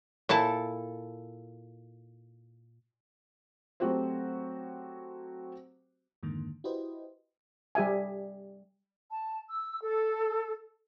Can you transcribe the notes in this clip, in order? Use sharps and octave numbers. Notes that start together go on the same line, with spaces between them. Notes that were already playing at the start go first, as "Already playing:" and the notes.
A#2 E4 A4 A5
F#3 A3 C4 F#4 G4 C5
F2 G#2 D3 D#3 A#3
E4 F#4 G4 B4 C5 D#5
G3 G4 E5 G#5
A5
E6
A4